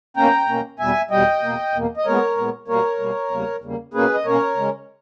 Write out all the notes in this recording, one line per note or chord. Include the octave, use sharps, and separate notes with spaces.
B2 A#3 C#4 G5 A#5
B2 A#3 C#4
E2 B2 G3 E5 G#5
E2 B2 G3 D#5 G5
E2 B2 A#3
E2 B2 A#3
D#5
A#2 G#3 B3 A#4 C#5
A#2 G#3 B3
B2 G3 A#3 A#4 C#5
B2 G3 A#3
E2 C#3 G3 A#3
E2 C#3 G3 A#3
B2 A#3 C#4 G#4 B4
D#5
B2 A#3 C#4 A#4 C#5
C#3 G#3 C#4